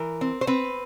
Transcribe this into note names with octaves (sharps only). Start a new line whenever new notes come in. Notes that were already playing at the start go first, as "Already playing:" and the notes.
Already playing: E3 A#4
C4
C5
C4 B4